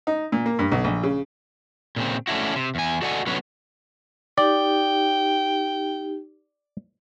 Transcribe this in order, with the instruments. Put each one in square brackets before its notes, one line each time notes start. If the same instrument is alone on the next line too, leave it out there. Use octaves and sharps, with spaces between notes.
[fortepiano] D#4
A#2
A#3
G2
B1
A#1
C#3
[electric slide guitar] A#2 C#3 C4
A3 C#4 D4 E4 F#4
C3
E2 G#5
F#4 A4 D5 D#5 F#5 G#5
D3 F#3 B3 C#4 B4 C#5
[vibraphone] D#4 G4 [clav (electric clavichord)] D5 [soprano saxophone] G5